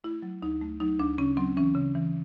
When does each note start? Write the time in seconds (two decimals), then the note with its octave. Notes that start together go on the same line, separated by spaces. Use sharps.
0.04 A3 E4
0.22 F#3
0.42 D2 D#4
0.61 A3
0.80 F#3 D#4
0.99 D2 D4
1.18 C#3 C#4
1.37 F#3 C4
1.57 E3 C#4
1.75 C#3
1.95 E3